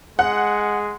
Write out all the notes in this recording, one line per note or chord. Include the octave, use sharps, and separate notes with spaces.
G#3 F#5 F#6